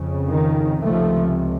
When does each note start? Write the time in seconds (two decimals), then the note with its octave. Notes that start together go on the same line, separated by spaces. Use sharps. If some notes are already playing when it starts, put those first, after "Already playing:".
Already playing: F2 C#3
0.31 D#3
0.82 C#2 C3 F3 A3